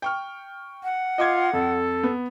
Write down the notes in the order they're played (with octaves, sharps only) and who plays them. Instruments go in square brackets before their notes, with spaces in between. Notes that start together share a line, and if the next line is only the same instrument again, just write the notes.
[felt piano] G5 C#6 F6
[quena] F#5
[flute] F4 [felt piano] D#5 D6 G#6
[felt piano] F2 [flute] A4
[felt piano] B3